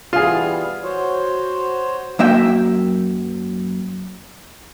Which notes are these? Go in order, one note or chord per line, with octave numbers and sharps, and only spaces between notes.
E3 G3 B3 F4 G#4
F#4 C5 C#5
F#2 A#3 E5 G5